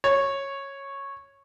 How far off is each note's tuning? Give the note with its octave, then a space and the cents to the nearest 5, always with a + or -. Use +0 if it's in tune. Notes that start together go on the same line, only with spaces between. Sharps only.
C#5 -10